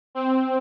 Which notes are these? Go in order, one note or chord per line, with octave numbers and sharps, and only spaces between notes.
C4